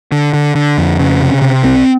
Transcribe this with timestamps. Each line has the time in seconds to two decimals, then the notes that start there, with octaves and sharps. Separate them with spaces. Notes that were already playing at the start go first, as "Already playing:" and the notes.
0.12 D3
0.34 D3
0.55 D3
0.78 F2
0.99 C#3
1.21 C3
1.42 C3
1.64 C2 C4